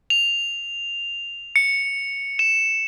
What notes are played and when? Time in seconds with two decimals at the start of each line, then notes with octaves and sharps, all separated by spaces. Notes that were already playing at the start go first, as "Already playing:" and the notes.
0.10 F7
1.56 C#7
2.39 E7